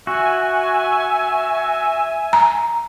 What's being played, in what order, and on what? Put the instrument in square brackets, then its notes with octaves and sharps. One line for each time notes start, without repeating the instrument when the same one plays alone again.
[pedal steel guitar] F#4 [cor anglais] E5 [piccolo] G#5
[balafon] A#5